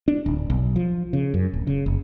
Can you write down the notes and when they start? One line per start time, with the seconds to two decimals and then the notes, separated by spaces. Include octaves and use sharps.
0.08 D4
0.26 D1
0.50 B1
0.76 F3
1.13 C#3
1.34 F#2
1.53 D1
1.67 C#3
1.86 F#1